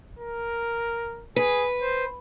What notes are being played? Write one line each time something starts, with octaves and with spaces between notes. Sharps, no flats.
A#4
G#4 B4
C5